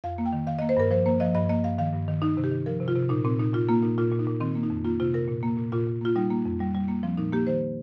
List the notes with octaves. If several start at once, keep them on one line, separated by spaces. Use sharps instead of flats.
F2 F5
A#3
G5
D#3
D#3 F5
D#5
A#3
C5
G2 A#4
F3 C5
A#3 C5
F3 D#5
G2 D#5
A#3 D#5
G2 F5
D#3 F5
G2
D#3
D#3 D#4
C3
G4
D#3
F3 A#4
C3
F4
C3
A#2 D#4
A#2 C4
A#2 D#4
A#2 F4
A#3 F4
A#2 D#4
A#2 F4
A#2
D#4
A#2
D#3 C4
A#3
D#4
F2
A#3 F4
C3 F4
C3 A#4
A#2
A#3
A#2
A#2 F4
A#2
A#3 F4
G3 D#4
A#3
F2
G3
G3
A#3
F3 C4
A#2 D#4
A#3 G4
D#3 C5